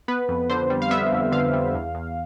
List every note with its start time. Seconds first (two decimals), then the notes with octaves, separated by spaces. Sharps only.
0.08 B3 B4
0.28 F2
0.50 D3 C5
0.70 G3
0.82 F5
0.91 B3 E5
1.12 F2
1.32 D3 F5
1.53 G3
1.74 E2
1.94 E2